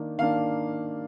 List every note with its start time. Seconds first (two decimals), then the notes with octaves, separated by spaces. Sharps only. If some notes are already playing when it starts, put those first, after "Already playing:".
Already playing: D#3 A#3 D4
0.18 D#3 A#3 D4 F5